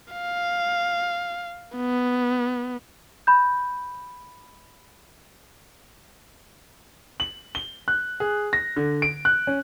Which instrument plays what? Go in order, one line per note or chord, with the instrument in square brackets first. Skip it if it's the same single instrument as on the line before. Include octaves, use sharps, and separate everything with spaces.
[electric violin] F5
B3
[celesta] B5 G6
[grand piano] F#7
G7
F#6
G#4
A#6
D3
D7
F#6
C#4